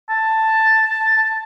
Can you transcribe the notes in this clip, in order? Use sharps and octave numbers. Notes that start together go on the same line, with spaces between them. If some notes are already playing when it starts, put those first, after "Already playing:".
A5